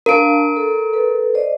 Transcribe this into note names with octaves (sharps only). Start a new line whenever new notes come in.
D4 A#4 F5 A5 D7
A4
A4 B4
C5 D5 D#5